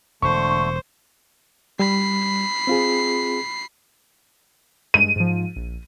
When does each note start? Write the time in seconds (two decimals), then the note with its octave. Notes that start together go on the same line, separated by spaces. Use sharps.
0.22 E1 D3 A3 C5 C#6
1.79 G3 B5 C7
2.67 C4 F4 G#4
4.94 G2 G#3 D#7
5.16 G#2 F3
5.56 A#1